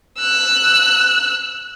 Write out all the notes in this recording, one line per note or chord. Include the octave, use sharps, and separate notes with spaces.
E6 F#6